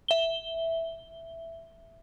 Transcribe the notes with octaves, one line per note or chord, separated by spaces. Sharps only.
E5 G7